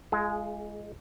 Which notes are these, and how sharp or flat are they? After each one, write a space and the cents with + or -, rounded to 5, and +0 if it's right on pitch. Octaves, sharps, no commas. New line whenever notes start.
G#3 +0 F4 -25 G#4 +30